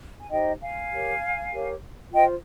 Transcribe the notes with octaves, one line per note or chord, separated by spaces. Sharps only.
G#5
D#4 G4 C5 D#5 G5
F5 G#5
G4 A#4 C#5
G4 A#4 C#5
F4 C5 D#5 G5